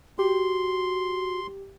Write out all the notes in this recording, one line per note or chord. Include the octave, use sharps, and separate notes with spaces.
F#4 G4 C6